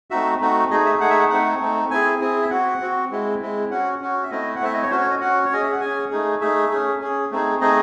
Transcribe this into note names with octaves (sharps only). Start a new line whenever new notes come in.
A3 C4 D#4 F#4 E5
A3 C4 D#4 F#4
A3 D#4 G#4 D#5
E5
A3 D#4 G#4 F#5
E5
F#5
A3 C4 D#4 F#5
A3 C4 D#4
C4 E4 G#4 G#5
C4 E4 G#4
E5
C4 F#4 F#5
C4 F#4
G#3 C4 E4
G#3 C4 E4
C#4 F#4 F#5
C#4 F#4
E5
A3 C4 E4 D#5
F#5
A3 C4 E4 E5
D#5
C#5
C#4 F#4 C5
C#5
D#5
C#4 F#4 F#5
C#5
C#4 G#4 D#5
E5
F#5
C#4 G#4 G#5
A3 D#4 G#4
A3 D#4 G#4 E5
C#4 G#4
C#4 G#4
A3 C4 D#4 G#4
A3 C4 D#4 G#4 D#5